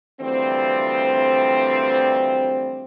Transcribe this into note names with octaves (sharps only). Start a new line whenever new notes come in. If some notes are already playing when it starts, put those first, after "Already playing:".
D2 E3 F3 G3 C4